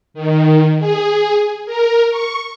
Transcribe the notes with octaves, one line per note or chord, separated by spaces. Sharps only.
D#3
G#4
A#4
C#6